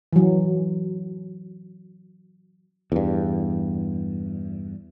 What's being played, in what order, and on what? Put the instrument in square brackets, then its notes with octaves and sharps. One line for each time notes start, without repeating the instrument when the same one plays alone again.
[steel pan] E3 F#3
[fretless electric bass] E2 G2